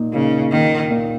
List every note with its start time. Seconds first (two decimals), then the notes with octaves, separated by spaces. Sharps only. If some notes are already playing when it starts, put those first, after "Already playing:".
Already playing: A#2 A#3 D#4
0.13 A#2 C#3 A#3 D#4
0.51 A#2 D#3 A#3 D#4
0.89 A#2 A#3 D#4